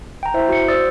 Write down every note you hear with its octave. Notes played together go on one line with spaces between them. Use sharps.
G5 A#5
E4 C5 E5
F#4 C#7
C5 D5 D#6 E6 A6